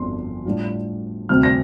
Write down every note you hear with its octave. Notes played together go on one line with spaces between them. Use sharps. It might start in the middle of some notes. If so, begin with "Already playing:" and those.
Already playing: G1 F2 D3 F3 C6
A2 G3 D4 F4
D2 C3 G3 C4 F6
A#6